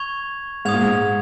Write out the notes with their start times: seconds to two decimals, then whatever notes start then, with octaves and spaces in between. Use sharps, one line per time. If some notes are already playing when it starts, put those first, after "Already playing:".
Already playing: C#6 G#6 F7
0.65 G#2 D#6 G#6 F7
0.74 A#2
0.82 G#2